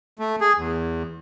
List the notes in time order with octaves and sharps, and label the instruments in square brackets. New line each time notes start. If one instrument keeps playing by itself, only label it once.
[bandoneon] A3
G#4
E2